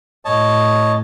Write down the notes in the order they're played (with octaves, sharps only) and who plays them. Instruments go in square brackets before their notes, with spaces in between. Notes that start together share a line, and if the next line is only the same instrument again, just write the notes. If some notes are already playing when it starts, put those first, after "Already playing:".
[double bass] A2 [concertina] C#5 D#5 A5